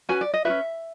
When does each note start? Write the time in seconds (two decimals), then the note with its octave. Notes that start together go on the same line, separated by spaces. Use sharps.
0.09 C#4 F#4 B4 G#5
0.21 D5
0.34 D#5
0.45 F#4 B4 E5
0.50 C#4